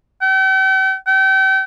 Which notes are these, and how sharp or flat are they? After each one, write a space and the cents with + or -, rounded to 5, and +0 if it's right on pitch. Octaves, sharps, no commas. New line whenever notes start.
G5 -45
G5 -35